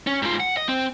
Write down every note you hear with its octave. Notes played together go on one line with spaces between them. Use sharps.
C#4
G#2 F4
F#5
D#5
C4